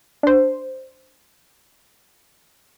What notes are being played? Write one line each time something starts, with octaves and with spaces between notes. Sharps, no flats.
D4 C5